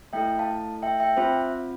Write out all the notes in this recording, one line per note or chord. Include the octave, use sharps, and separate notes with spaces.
A3 E4 A4 E5 G5
F5 A5
E5 G5
E5 G5
C4 F4 C5 E5